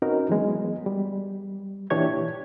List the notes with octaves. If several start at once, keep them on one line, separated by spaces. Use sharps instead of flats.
C4 C#4 D#4 F#4 A#4 B4
E3 F#3 G#3 B3
G3
A#2 E3 D4 G4 C#5 G#6